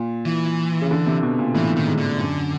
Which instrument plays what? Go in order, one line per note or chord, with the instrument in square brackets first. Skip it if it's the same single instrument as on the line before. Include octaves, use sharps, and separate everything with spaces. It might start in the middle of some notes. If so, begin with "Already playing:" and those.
Already playing: [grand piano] A#2
[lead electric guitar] E3
[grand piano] C#3
D3
C3
B2
A#2
[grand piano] A2 [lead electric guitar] E3
[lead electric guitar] D#3
[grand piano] G#2
[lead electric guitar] D3
[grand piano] F#2